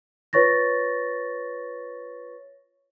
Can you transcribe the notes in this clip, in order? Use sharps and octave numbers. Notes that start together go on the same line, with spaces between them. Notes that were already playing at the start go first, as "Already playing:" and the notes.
F4 B4 C#5 C#6 A6 A#6